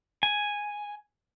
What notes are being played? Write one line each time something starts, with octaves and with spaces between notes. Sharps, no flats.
G#5